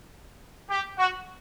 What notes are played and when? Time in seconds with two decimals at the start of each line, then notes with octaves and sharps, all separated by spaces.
0.70 G4
0.97 F#4